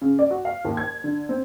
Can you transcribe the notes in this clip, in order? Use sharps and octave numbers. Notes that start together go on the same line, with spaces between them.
C#3
D5
F#4
F5
D#2
G#6
D3
C4